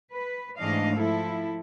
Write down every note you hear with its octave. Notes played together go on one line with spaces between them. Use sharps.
B4
G#2 E3 A3 D4 D#5 F5
F3 E4 A4